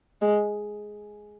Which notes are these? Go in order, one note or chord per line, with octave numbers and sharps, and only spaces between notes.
G#3